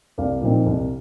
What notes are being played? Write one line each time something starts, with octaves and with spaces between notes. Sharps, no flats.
C2 D5 F5
A#2 F3 C4 D#4
C2